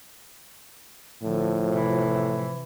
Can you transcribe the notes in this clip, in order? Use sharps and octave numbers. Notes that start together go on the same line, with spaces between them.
A2 D3 F3
C3 E3